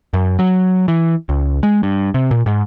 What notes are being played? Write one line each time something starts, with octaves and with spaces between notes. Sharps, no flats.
F#2
F#3
E3
C#2
G#3
G2
C3
A#2
G#2